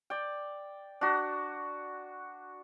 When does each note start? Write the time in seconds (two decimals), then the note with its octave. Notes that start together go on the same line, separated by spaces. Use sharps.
0.10 D5 G5
1.01 D4 F#4